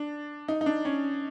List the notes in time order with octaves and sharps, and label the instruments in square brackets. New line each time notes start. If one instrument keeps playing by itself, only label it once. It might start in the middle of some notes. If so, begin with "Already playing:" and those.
Already playing: [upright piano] D4
D#4
D#4
D4
C#4